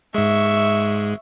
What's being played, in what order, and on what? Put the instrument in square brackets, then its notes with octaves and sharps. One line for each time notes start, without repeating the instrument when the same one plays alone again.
[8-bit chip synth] G#2 G#3 [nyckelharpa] E5 C#6